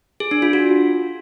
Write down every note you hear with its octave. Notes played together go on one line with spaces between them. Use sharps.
G#4
D4
F4
F#4